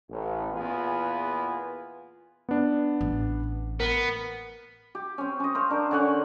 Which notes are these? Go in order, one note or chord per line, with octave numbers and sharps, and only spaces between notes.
A1
E2 A#2 B3 F4 G#4 B4
B3 D4
A1
B3 A#4
G4
C4 C#4
C#4 D#5
C5 F5 C#6
D4 A#4
D3 C#4 F#5 C#6